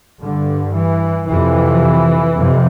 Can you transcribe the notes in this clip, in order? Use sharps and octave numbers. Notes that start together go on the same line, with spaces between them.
G2 D3
E3
F2 C3 E3
F2 C3